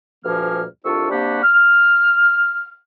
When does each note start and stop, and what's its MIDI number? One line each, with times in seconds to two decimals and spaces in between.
0.24 0.63 38
0.24 0.63 43
0.24 0.63 46
0.24 0.63 53
0.24 0.63 58
0.24 0.63 89
0.85 1.07 36
0.85 1.07 41
0.85 1.07 62
0.85 1.07 65
0.85 1.07 85
0.85 1.07 88
1.10 1.41 48
1.10 1.41 55
1.10 1.41 58
1.10 1.41 62
1.10 1.41 66
1.10 1.41 67
1.42 2.76 89